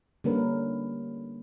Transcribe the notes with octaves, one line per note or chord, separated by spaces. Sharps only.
D3 G3 A#3 C#4 A#4 B4